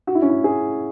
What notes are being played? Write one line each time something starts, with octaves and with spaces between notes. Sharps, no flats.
F#4
E4
C#4
E4
G#4